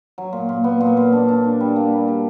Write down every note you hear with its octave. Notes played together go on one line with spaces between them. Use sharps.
F#3
A#2
A#2
B3
A#2
A#2
D4
D4
D4
G3
A#3
G3
G3